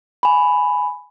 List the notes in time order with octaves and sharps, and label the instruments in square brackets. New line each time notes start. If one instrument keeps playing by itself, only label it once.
[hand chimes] G#5 B5